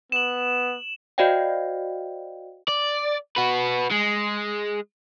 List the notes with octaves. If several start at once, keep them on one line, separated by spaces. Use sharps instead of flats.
B3 E7 F#7
F#4 C5 D5 D#5 F5 G5
D5
F#4 B4
G#3